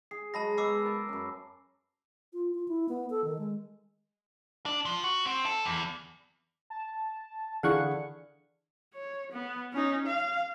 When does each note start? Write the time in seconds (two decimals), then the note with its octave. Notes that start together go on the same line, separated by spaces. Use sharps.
0.11 G#4 C7
0.34 F#3 G#3 A5 B5 A#6
0.58 G#3 B3 D6 E6 C7
0.82 A#4 A5
1.09 F#2 C#4
2.33 F4
2.54 F4
2.68 E4
2.89 B3
3.10 A4
3.24 D#3
3.38 G#3
4.66 D4
4.85 F3
5.04 F#4
5.26 C4
5.46 A4
5.65 E2
6.70 A5
7.63 D3 E3 E4 G#4 D5 F5 F#5 C#6
8.94 C#5
9.32 B3
9.73 C#4 D#4
10.07 F5